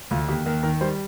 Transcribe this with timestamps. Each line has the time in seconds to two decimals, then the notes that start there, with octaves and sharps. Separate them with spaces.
0.11 D2 F4
0.28 D#2 G4
0.46 D#2 A#4
0.63 D#3 A#4
0.81 G3 C5